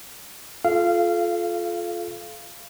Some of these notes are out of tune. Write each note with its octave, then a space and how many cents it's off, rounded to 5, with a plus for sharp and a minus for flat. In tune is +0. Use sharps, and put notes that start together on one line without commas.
F4 +0 A4 -30 F5 -20